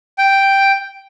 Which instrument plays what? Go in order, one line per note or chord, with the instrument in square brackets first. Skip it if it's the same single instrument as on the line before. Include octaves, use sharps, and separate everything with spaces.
[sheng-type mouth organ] G5